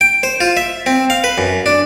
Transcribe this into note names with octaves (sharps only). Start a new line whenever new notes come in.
G5
C5
F4
E5
C4
F5
B4
F#2
D4